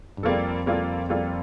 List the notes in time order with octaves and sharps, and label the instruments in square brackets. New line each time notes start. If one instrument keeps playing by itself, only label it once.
[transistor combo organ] G2
[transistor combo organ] F2 [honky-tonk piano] G3 A#3 F4 A4
[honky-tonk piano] G3 A#3 F4 A4
G3 A#3 F4 A4